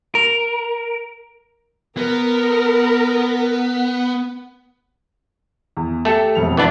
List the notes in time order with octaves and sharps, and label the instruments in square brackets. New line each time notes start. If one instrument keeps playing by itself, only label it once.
[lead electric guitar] A#4
[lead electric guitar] B3 [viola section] A#4
[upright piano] E2
[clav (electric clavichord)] A3 A4 [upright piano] G4 C#7
[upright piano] E1 F2 F7
[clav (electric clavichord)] E3 B3 D4